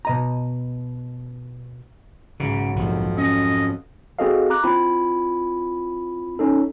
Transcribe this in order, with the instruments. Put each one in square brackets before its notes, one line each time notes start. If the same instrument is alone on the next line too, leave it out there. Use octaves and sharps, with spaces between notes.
[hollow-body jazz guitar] B2 D#5 A#5
[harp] B1 G#2 [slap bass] C#3
[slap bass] A#1 C3 D#3 [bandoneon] F2
[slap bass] C#4 [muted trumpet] D#5
[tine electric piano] C4 F#4 G#4 A4 D#5 F5
A#5 D6 F#6
C4 E4 F4 B5
C#4 D#4 A4